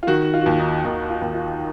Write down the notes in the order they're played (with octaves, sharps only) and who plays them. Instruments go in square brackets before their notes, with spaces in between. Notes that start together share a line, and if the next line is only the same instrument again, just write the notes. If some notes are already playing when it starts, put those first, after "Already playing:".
[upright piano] F4
D#3 F#4
F4
F#4
D#2 F4
D#4
D#2 D#4
F4
D#2
F4